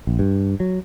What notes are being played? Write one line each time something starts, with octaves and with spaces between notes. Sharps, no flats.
A#1
G2
F#3